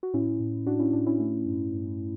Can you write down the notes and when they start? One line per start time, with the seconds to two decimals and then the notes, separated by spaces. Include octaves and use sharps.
0.03 F#4
0.14 A2 C#4 E4
0.40 A2
0.67 A2 D4 F#4
0.79 C#4 E4
0.93 A2 D4
1.06 C#4 E4
1.20 A3
1.46 G2
1.73 G2